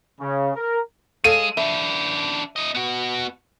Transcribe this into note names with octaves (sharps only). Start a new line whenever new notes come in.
C#3
A#4
G#3 A4 C#5 F5 D#7
E3 D4 E5
E4 D#5
B3 F#4